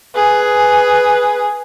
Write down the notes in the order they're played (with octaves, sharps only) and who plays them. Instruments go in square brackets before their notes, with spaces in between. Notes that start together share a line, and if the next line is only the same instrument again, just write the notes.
[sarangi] G#4 [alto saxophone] B4